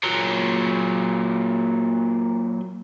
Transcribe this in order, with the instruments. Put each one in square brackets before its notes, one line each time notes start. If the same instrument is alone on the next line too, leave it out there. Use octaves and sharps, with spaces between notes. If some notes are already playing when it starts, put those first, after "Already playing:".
[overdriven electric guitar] A#2 F#3